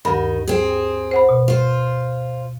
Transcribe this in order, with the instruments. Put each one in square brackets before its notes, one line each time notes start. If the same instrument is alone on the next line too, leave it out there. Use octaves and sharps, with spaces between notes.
[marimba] D2 G2 B5 [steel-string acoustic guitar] D#3
[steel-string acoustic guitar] C4 G#4
[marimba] C5 F#5 B5
B2
[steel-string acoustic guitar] F4 C5